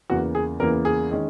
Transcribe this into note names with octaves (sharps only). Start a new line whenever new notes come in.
E2 C#3 E3 A#3 F#4
G#4
E2 C#3 E3 A#3 A#4
G#4
D#3 G#3 C#4